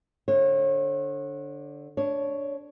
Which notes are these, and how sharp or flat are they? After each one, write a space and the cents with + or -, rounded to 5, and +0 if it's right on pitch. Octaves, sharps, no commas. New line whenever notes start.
D3 +0 C#5 -35
D4 -10 C#5 +0